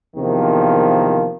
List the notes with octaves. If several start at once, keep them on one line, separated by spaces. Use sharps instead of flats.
E2 C3 D#3 F3 A#3